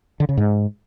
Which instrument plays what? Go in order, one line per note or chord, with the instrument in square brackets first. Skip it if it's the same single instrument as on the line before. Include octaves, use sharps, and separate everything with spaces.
[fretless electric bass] D3
C#3
G#2